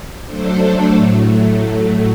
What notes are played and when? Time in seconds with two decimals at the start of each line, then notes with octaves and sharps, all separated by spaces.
0.25 F#3 A3 D4 A4 C5
0.93 A2 F#3 A3